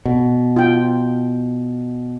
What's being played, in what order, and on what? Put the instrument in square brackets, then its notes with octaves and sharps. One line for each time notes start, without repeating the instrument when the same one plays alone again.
[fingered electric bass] B2
[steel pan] F4 G5